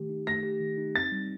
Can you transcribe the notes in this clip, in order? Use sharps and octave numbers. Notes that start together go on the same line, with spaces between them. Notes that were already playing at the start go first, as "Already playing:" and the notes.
Already playing: D#3 A3 G4
D#4
A3 A#6
G4
D#3
D#4
C4 A6
G3